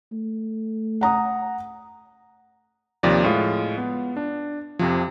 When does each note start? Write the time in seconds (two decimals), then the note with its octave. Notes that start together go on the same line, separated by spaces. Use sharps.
0.12 A3
1.01 F#5 A#5 D#6
3.03 D#2 C3 F3 D5
3.24 A2 G#3 F4
3.78 B3
4.17 D4
4.79 F2 C3 F3